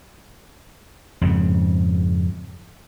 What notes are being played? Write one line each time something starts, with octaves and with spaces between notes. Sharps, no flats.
F2 G#2 C#3